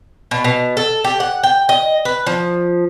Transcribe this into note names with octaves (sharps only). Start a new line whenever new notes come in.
B2
B2
A4
G4
F#5
G5
D#5
B4
F3